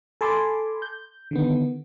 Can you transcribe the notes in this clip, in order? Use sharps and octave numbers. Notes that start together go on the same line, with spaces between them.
A4 G#5 A5 B5 C6 D6
G6
D3 D#3 B3